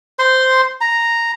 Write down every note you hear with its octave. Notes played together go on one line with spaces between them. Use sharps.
C5 C6
A#5